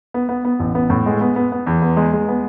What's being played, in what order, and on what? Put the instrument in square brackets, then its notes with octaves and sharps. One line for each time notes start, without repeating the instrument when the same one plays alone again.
[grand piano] B3
B3
B3
A1
B3
A2
G#3
B3
B3
B3
E2
B3
G#3
G#3
B3